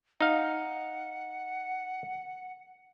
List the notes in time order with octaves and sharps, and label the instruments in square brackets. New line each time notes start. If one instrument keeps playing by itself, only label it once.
[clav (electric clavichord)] D#4 F5 [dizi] F#5